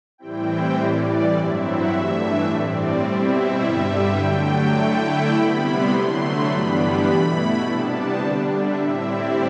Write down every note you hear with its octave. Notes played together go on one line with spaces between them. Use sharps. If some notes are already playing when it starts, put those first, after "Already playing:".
A2 E3 G3 C4 E4 G5
C5
A2 E3 G3 D5
G2 F#3 C4 E4 E5
F#5
G2 E3 A3 D4 E5
A2 G3 C4 D5
B2 G3 C4 E4 E5
G2 D3 G3 E5
G5
D3 F#3 A3
G5
D3 A3 E4
B5
C3 G3 B3 E4
C6
D3 F#3 A3
B5
G2 E3 G3 B3 D4
B2 A3 E4 B5
C3 G3 B3 D4 A5
D3 G3 D4
E5
A2 G3 C4 E4
D5